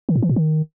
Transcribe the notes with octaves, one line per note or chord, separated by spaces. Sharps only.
D#3
A2
E3
A#2
D#3